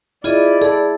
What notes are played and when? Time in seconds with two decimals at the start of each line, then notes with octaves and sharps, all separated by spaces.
0.24 E4 F4 G#4 D5 D#5
0.62 G#4 A4 B5